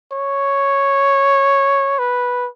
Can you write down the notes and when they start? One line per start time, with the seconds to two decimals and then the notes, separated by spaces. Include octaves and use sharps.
0.12 C#5
1.99 B4